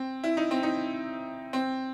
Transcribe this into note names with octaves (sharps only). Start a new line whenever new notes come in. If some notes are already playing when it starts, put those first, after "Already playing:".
Already playing: C4
E4
D#4
C4
D#4
C4